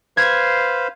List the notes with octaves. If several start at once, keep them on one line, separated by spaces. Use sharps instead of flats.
B4 C5 F5 G#6